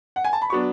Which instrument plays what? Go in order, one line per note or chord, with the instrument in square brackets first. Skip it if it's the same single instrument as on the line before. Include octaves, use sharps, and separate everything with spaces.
[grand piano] F#5
G#5
A5
B5
[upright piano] F#3 B3 D4 [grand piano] C#6